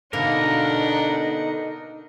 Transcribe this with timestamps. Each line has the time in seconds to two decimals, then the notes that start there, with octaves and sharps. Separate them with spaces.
0.13 B2 D3 A#3 D4 D#4 A#4 F#5